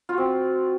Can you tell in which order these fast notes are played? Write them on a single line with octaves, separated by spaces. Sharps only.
F4 F#4 C4